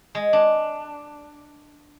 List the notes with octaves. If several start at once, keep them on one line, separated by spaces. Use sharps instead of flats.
G#3
D4